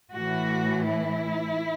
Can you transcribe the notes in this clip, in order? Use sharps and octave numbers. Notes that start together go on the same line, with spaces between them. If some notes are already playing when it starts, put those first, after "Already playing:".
A2 E3 F#4
E4